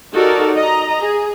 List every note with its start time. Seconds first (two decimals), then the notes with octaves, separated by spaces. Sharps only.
0.14 D#4 F#4 G4 A4 A#4 D5
0.57 D#5 A#5
1.01 G#4